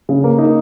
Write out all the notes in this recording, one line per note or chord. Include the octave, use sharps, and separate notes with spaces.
C#3
A#3
D#4